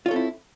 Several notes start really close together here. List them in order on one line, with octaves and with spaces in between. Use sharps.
F4 C#5 A4 C4 E4